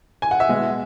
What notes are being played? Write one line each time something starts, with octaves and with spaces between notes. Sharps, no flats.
G#5
F#5
E5
B2 G#3